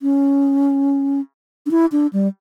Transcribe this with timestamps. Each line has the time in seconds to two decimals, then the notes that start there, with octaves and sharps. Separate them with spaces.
0.02 C#4
1.66 D4
1.71 E4
1.92 D4
2.13 G3